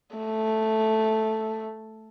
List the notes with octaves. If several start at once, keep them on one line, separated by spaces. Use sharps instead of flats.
A3